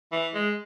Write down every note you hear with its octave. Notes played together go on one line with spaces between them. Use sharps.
E3
G#3